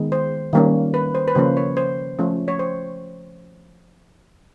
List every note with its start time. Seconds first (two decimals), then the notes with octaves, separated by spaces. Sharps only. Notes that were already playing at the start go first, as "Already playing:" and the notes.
Already playing: D#3 G#3 B3
0.12 C5
0.53 D#3 G3 A#3 C#4
0.94 B4
1.15 C5
1.28 B4
1.35 C#3 F3 A#3 C#4 C5
1.57 C#5
1.77 C5
2.19 F3 A3 C#4
2.48 C#5
2.59 C5